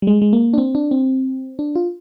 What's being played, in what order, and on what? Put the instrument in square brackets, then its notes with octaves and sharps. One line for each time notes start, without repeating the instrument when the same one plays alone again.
[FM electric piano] G3
G#3
G#3
A#3
D4
C4
D4
C4
D4
F4